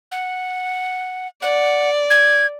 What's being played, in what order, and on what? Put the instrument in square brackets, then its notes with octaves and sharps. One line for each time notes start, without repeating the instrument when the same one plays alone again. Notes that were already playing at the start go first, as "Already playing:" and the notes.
[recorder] F#5
[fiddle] D5 [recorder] F#5
[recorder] G#6